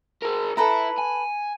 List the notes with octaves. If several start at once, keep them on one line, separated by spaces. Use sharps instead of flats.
G#4 A#4
E4 A4 B4 A#5
G#5